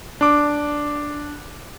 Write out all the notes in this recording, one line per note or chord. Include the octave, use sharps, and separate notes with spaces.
D4 D6